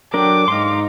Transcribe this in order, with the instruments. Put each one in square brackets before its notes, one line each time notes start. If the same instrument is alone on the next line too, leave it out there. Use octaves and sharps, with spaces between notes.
[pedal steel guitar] F#3 D4 A#4 [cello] A4 G5 [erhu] D6
[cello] G#2 D#4 [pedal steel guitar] F5 C6